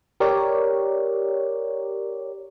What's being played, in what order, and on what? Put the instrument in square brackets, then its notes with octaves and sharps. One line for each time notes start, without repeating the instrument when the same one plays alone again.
[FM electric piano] G4 A#4 C#5 D5